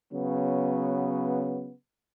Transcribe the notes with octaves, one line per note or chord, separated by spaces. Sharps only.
C#3 F#3 B3